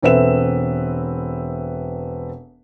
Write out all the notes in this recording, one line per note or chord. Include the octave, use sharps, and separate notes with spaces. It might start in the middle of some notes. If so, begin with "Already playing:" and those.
E1 C4 A4 B4 E5 E7